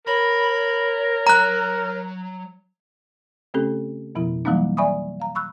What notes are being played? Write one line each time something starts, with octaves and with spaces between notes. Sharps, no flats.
A#4 C#5 B5
F#3 A#5 F#6
C#3 A3 C4 C#4 G4 A4
F2 B2 F3 B3 E4
E3 F#3 G3 A#3 C4 D#4
D5 E5 G#5 B5 C#6 D#6
F5 A#5
B5 C#6 E6 F#6